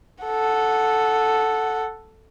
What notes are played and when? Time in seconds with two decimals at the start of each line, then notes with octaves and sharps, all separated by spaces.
0.24 A4 F#5